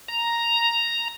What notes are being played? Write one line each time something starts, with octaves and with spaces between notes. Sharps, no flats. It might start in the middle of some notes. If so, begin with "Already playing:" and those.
A#5